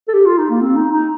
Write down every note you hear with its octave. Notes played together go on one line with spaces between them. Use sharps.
A4
G4
F4
D#4
A#3
C4
D#4
D#4